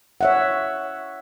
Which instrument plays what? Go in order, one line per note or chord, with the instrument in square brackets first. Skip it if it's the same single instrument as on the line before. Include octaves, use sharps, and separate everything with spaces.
[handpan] C#5 E5 F#5